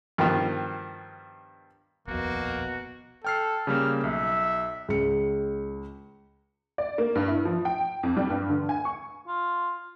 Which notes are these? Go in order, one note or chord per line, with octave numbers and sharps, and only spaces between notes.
G2 B2 D#3 F3
D#1 A#1 F2 B2 A#3 F#4
A4 G5 F6 C7
C#3 G3 A#3 F6
B1 E5
C#2 C#7
D5
A#3
G2
E4
F3
G5
F2
G3
G2
D3
G#5
C#6
F4